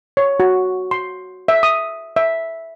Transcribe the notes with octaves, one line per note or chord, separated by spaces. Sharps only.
C#5
F#4
C6
E5
D#6
E5